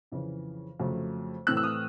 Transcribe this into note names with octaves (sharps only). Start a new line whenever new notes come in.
F2 C#3 E3
F2 C#3 F#3 A3
A2 E3 A3 C4 E6 F#6
E6
D#6 F6